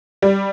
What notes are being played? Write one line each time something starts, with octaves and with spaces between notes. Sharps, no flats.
G3